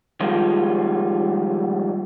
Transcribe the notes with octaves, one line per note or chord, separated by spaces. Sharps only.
D#3 F3 G3 G#3 F4